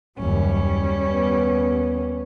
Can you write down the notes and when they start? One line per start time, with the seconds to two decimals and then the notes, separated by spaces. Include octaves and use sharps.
0.19 F#1 D#2 G3 C#4
1.09 D#2 B3